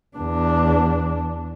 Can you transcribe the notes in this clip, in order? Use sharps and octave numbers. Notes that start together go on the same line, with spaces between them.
E2 D4